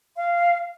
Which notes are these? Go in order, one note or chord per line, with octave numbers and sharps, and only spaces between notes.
F5